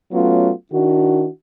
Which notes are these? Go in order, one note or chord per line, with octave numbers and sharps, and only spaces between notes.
F#3 A3 B3 C#4 F4
D#3 D4 E4 F#4